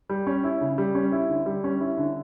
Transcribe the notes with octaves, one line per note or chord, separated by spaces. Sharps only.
G3
C#4
E4
C#3
G3
C#4
E4
D3
G3
C#4
E4
D3